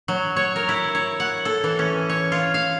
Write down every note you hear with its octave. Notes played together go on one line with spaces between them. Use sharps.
F#3
C#5
A#4
E4
C#5
F#5
A4
E3
C#4
C#5
F4
F5